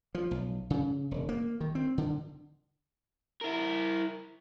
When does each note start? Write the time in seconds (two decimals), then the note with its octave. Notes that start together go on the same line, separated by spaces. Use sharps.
0.15 F3
0.31 B1
0.70 C#3
1.11 E1
1.29 A#3
1.61 D#3
1.75 C4
1.98 D3
3.41 E4 A#4